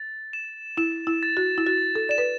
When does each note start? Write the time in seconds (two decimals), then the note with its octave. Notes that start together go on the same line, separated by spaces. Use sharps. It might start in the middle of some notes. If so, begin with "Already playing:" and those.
Already playing: A6
0.33 E7
0.77 E4 E7
1.07 E4
1.23 A6
1.37 F#4
1.58 E4
1.66 F#4 A6
1.95 A4
2.09 D5 E7
2.18 B4